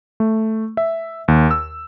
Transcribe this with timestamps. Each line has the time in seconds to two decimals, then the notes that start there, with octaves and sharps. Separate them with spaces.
0.20 A3
0.77 E5
1.28 D#2
1.51 E6